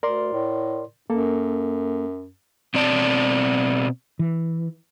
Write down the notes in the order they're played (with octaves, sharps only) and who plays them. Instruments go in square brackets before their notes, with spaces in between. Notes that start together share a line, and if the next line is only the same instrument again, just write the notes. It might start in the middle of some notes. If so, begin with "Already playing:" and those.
[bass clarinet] D2 [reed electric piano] A#4 D5 C6
[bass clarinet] A2
[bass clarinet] F#2 [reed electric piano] A#3 A4
[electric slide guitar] B2 C4 D5 A5
[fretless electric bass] E3